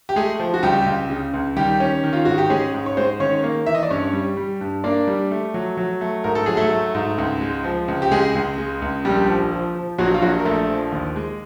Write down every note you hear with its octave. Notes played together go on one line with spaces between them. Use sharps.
G4
G#3 A3 G#4
F3
F#4
C#2 G3 G4
C#2
C#3
C#2
D#3 G3 G4
C#4
D#3
F4
G#2 F#4
G4
G#3 C#4 G#4
G#2
C#5
G#3 C4 C5
D#3 C#4 C#5
A#3
E3 E5
D#5
D5
G2 C#4 C#5
G3
G3
G2
A#3 D4 D5
G3
A3
F#3
F#3
A3
G#2 A#4
A4
F#3 G#4
A3 A4
A3
G#2
C#2
G#3
F3
C#2
G4
C#2 G#3 G#4
C#2
G#3
C#2
A#1 G3 G4
F3
F3
F3
A#1 F#3 F#4
F4
A#1 F#3 F#4
A#4
A#1 A3 A4
F3
D#2
G#3